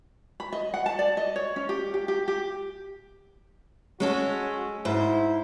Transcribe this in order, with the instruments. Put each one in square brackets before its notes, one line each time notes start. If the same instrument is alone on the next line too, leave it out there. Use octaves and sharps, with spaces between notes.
[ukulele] B5
D#5
F#5
A5
D5
D#5
C#5
C#4
G4
G4
G4
G4
[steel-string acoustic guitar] G#3 C#4 A4 [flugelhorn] F#4
[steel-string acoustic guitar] G#2 C5 [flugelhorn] E4